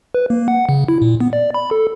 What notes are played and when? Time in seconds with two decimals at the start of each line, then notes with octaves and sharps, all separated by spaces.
0.15 B4
0.30 A#3
0.48 F#5
0.69 C#3
0.88 E4
1.02 A#2
1.20 B3
1.33 D5
1.54 B5
1.71 A4